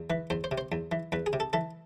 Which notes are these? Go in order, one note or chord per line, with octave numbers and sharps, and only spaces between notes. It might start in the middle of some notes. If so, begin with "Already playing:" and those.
Already playing: E2
E3 B4
E2 C5
C5
C3
C5
E2
E3
E2 B4
G#4
C3
A4
E3 A4